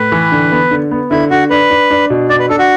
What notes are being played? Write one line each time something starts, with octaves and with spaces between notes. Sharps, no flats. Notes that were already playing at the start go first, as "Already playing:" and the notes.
Already playing: A2 B4
E3
D3
B3
D3
B3
D3 E4
D3 F#4
D4 B4
D4
D4
B2
D4 D5
B4
D4 A4
F#4